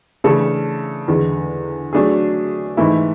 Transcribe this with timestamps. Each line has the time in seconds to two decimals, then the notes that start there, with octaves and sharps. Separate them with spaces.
0.24 C#3 E3 A3 D4 A4
1.08 E2 D3 G#3
1.93 F#3 A3 D4 G#4
2.77 G#2 E3 A3 E4